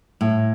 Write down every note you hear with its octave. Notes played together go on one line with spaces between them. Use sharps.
A2